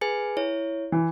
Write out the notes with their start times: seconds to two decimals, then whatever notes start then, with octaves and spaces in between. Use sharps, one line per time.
0.01 G#4 B4 G#5
0.37 E4 C#5
0.92 E3